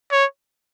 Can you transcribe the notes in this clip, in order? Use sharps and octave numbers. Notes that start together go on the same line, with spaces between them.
C#5